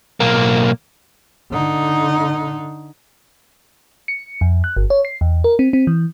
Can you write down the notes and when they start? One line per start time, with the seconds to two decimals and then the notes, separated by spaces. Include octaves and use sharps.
0.20 B1 A#3
1.52 D3 D#4
4.08 C#7
4.41 F2
4.64 F#6
4.77 G1
4.90 C#5
5.05 C7
5.21 E2
5.44 A#4
5.59 C4
5.73 C4
5.87 E3